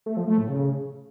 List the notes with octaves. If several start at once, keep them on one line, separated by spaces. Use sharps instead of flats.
A3
F3
A3
A2
C#3